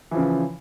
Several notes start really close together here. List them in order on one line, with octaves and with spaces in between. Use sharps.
E3 F3 C#3